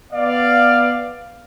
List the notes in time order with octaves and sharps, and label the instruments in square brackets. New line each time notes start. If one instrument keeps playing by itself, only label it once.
[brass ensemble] B3 D5 F5